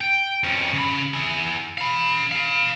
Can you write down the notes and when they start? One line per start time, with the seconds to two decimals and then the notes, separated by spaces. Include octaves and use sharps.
0.01 G5
0.44 F2 C#4
0.74 C#3 B5
1.14 E4 G#4
1.78 F5 B5
2.31 F5 B5